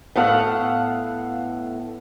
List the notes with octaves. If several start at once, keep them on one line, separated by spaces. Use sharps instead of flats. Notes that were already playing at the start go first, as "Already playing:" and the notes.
A2 B3 A4 F5 F#5